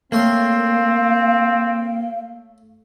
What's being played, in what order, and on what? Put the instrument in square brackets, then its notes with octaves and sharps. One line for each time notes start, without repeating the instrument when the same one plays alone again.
[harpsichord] A3 C#5 C6 [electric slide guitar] A#3 [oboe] C4 [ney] F5